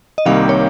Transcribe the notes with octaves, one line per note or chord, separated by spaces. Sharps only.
D#5
C2 C3 D#3 G3 A#3 F5
C#5